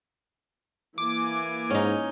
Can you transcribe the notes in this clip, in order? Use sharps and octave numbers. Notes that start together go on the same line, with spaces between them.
E3 A#3 G#5 D6
G#2 C#4 D#4